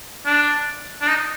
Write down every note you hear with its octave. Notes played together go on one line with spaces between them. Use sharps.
D4
D4
D#4